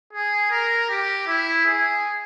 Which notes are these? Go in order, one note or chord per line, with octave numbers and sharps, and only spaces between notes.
G#4
A#4
G4
E4
G#4